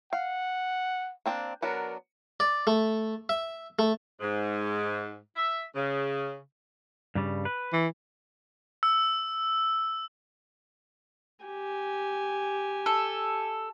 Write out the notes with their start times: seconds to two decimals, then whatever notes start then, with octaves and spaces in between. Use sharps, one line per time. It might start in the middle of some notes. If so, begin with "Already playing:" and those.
0.13 F5 F#5
1.26 A#3 C4 D4
1.62 F#3 B3 D4 A#4
2.40 D5
2.67 A3
3.29 E5
3.79 A3
4.21 G#2
5.35 E5
5.75 C#3
7.15 G2 C#3 G3
7.45 B4
7.73 E3
8.83 E6
11.45 G4 G#5
12.86 A4